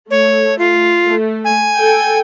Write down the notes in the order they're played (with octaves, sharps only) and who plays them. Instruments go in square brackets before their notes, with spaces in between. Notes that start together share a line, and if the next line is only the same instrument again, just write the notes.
[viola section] A3 [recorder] C#5
[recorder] F4
[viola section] A3
[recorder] G#5
[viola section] A4 G5